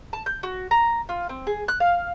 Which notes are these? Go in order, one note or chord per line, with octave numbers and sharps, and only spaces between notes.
A5
G6
F#4
A#5
F4
C4
G#4
F#6
F5